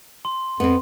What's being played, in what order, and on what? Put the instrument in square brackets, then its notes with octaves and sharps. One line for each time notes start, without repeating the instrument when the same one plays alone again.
[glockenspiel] C6
[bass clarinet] F2 [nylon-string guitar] B3 C4